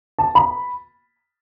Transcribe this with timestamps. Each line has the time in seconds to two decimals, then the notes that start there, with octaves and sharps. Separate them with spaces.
0.19 A5
0.35 B5